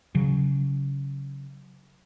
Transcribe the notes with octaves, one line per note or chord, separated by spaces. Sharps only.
C#3 F#3